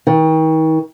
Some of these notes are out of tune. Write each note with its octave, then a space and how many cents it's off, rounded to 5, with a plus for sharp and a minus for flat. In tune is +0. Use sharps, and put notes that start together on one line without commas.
D#3 +40